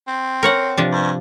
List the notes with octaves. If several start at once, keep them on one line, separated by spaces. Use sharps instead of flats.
C4
A#4 C#5 F#5
C3 F3 D4
G2